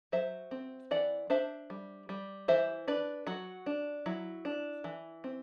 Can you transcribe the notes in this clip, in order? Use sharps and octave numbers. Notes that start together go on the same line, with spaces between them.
F#3 C5 E5
C4
E3 D5 F#5
D4 C5 E5
G3
G3
E3 C5 E5
D4 B4 D5
F#3 F#4
D4
F#3 E4
D4
E3
C4